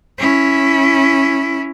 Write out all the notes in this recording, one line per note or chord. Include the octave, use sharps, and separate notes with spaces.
C#4 E4